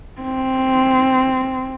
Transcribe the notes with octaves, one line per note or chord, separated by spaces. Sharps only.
C4